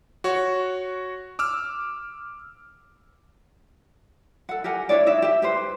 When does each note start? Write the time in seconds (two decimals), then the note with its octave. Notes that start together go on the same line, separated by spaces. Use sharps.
0.24 F#4 C#5 C#6
1.39 D6 E6 F6
4.49 A4 F#5
4.64 G4 A#4 F#5 G#5
4.89 D4 E4 C#5 D5
5.06 D#4 E4 E5
5.22 G4 E5
5.42 G4 B4 C5